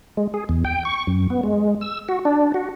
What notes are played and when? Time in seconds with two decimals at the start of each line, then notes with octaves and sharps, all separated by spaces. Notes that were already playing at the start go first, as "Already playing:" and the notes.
0.17 G#3
0.34 G#4
0.49 E2
0.65 G5
0.85 C#6
1.07 F#2
1.30 B3
1.43 G#3
1.81 E6
2.09 F#4
2.25 D4
2.54 F#4